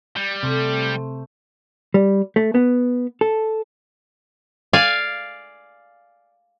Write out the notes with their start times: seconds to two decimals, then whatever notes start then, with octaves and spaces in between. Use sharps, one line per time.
0.16 G3
0.43 C3 A3 C5
1.94 G3
2.36 A3
2.55 B3
3.21 A4
4.73 D5 F5 G#5